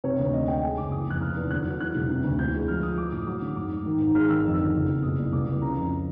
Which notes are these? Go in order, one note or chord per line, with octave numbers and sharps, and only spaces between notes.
C3 C#5
D2
D3 D#5
D3 G5
G#3 G#5
F#1 D6
E3 D#6
F2 F#6
F1 F6
E2
D3 F#6
F#3
E3 F#6
E1
C3
D2
E3 G6
G#3
F3 F6
F3 D#6
G#3 D6
A2 D#6
F#3 D6
D3
G#2 D6
G#2
D#3
G#1
G#3 F6
D#3 E6
F2
D3
F#1
F#1
B2 D#6
C2
C#2 D6
C#2
C#3 A#5
F2